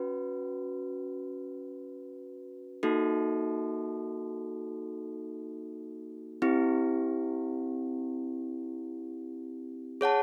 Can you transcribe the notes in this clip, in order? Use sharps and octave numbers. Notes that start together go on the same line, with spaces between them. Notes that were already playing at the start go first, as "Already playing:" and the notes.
Already playing: C#4 F#4 B4
A#3 D#4 F#4 A4
C4 E4 G4
G#4 C#5 F#5 A5